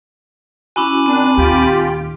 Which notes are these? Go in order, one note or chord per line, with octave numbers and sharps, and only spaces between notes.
C#4 E4 F#4 G#5 B5 D6
D#3 C4 D4
D#2 A#2 F4 G4 G5